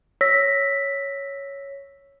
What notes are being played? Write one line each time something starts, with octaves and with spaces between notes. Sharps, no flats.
C#5 E6 A#6 B6